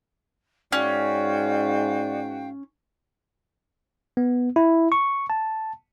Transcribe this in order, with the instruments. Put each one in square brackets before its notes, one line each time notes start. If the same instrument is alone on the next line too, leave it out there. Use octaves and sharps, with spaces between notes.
[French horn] G#2 [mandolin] C#4 [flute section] F#4 F5 G5 [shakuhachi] D5
[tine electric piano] B3
E4
C#6
A5